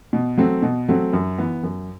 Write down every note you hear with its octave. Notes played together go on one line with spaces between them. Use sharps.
B2
F#3 A3 C4
B2
F#3 A3 C4
F#2
E3 B3
F#2